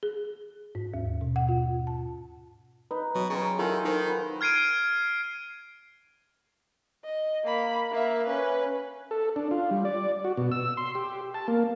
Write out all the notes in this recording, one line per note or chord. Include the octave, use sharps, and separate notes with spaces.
G#4
G#2
D#2
B2
F#5
F4
A5
D#4 B4
B2 F#3
C#3 C5 G5 A#5
D#3 E4 F4 G#4 A4
D#3 D#4 C5
B4 F#5
F6 G#6 C7 D7 D#7
D#5
A#3 B5
A#3 E5
C#4 B4
A4
D4
F4
G3
D5
F#4
B2
E6
C6
G4
A5
A#3